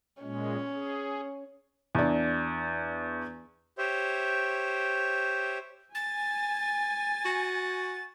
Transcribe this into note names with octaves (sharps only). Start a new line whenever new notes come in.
A#2 G#3 C#4
G#4
E2 D4
G4 C5 C#5 E5
G#5 A6
F#4